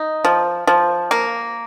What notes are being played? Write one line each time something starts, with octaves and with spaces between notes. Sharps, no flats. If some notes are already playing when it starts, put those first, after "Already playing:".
Already playing: D#4
F3
F3
A#3